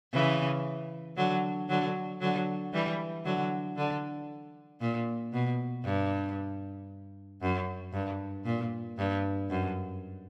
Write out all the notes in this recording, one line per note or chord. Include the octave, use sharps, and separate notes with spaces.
C#3 E3
D3 F#3
D3 F#3
D3 F#3
E3 G3
D3 F#3
D3
A#2
B2
G2
F#2
G2
A#2
G2
F#2